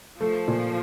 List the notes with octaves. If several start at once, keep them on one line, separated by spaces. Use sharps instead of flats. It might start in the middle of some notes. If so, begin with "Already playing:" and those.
F3 A3
A#2